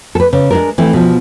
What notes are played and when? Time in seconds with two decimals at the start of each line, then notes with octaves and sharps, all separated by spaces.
0.15 A4 B4
0.33 C#3
0.51 G#3 D4 A#4
0.78 E3 A3 C4
0.93 B2 F3